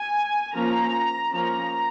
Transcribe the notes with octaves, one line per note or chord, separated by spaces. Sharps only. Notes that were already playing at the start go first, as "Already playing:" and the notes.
Already playing: G#5
F3 A#3 C#4 A#5
F3 A#3 C#4 A#5